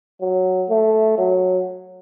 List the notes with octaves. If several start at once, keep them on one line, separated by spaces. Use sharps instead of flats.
F#3
A3
F#3